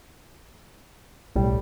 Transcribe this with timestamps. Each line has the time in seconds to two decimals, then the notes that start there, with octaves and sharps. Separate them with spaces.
1.36 B1 A2 G3